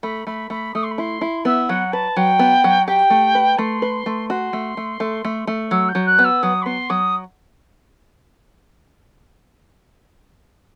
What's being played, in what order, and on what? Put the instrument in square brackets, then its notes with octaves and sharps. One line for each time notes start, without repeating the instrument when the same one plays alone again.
[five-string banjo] A3 [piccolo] B5
[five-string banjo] A3 [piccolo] B5
[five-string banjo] A3 [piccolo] B5
[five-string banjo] A3 [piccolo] D#6
[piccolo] C6
B5
[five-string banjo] E4 [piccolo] C6
[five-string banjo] E4
[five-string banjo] B3 [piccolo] E5
[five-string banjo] F#3 [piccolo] F#5
[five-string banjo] B4 [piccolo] A5
[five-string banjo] F#3 [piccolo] G5
[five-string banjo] B3
F#3
[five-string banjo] G4 [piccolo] G5
[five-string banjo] A3
B4
[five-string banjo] A3 [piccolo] C6
[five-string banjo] B4
A3
[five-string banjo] F#4 [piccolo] C6
[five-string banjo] A3
A3
A3
A3
A3
[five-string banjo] F#3 [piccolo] E6
[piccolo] G6
[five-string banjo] F#3
[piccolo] F#6
[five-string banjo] B3
[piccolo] E6
[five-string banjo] F#3 [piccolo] D#6
[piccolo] B5
[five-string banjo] B3 [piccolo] C6
[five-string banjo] F#3 [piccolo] D#6